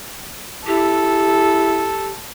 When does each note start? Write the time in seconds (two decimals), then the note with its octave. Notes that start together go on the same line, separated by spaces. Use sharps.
0.66 E4 G4 A4